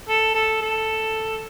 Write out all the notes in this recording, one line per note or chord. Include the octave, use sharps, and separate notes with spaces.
A4
A4
A4